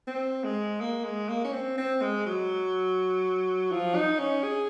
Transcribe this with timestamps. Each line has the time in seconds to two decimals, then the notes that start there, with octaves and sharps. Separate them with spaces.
0.07 C4
0.44 G#3
0.81 A#3
1.04 G#3
1.29 A#3
1.44 C#4
1.52 C4
1.78 C4
2.01 G#3
2.26 F#3
3.72 F3
3.95 D#4
4.19 C#4
4.44 G#4